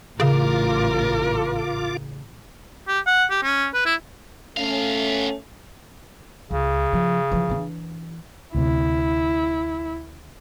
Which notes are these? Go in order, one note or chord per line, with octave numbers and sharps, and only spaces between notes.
A1 C#3 F4 A#4 D6
G4
F#5
G4
C#4
B4
E4
A3 B3 C#4 F5
C#2 C#3
F3
E3 F3
E3 D4
D2 C3 E4